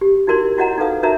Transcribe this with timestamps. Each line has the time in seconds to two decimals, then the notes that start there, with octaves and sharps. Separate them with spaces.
0.01 G4
0.27 D#4 E4 F#4 A#4 D5 C6
0.57 E4 F#4 C#5 D#5 F#5 A#5
0.78 D#4 A4 B4 F5 D#6
1.03 D#4 F#4 A#4 C#5 E5 A#5